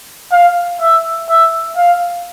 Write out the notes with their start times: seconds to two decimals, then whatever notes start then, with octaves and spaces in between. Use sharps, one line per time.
0.32 F5
0.81 E5
1.29 E5
1.77 F5